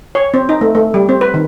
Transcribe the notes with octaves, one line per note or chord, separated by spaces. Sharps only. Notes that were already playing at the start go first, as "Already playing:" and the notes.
C#5
C4
D#4
A3
A3
G3
C4
B4
D#3